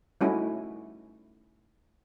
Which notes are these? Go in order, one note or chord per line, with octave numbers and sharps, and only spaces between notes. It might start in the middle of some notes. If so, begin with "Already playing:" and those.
G3 A3 C#4 D#4 E4 F#4